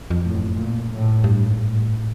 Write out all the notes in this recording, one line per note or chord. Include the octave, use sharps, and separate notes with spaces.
F2
A2
F#2
A#2
A2
G2
G#2
A2